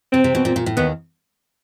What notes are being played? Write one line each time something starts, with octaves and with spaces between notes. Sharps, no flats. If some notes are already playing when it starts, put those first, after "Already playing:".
C3 C4
C3
B2
A#2
A#2
A2
D#2 D#3 B3